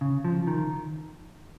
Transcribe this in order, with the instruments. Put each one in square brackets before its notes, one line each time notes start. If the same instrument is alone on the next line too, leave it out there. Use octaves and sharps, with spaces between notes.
[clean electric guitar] C#3
F3
D#3